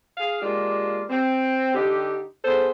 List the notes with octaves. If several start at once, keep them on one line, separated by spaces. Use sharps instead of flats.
G#4 F5
G#3 A#3 D4 F4 G4
C4
D3 D#4 G4
B3 G#4 A4 C5